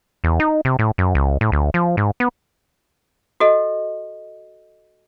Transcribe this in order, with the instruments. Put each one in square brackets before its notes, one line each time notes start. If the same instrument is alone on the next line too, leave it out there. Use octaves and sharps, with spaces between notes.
[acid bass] E2
D#4
C3
A2
F#2
C#2
A2
D2
F3
G#2
B3
[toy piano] F#4 A4 D#5